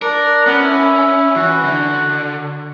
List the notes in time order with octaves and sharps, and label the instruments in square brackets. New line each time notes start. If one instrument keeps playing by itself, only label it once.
[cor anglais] D4 [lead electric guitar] A#4
[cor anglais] B3 [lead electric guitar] C#4
[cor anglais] E4
[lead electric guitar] E3 [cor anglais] F#4
[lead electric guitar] D3